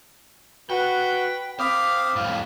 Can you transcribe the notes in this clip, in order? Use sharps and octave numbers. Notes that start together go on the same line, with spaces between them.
F#4 B4 G5
C4 F5 B5 D6 D#6 F6
F2 A2 F5